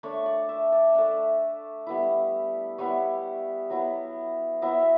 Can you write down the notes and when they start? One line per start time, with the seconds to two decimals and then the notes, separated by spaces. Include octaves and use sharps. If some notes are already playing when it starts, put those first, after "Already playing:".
0.03 A3 D4 C#5
0.26 D5
0.49 E5
0.72 D5
0.95 A3 D4
1.86 G3 B3 E4
2.78 G3 B3 E4 C#5
3.70 F#3 B3 E4
4.62 F#3 B3 E4 E5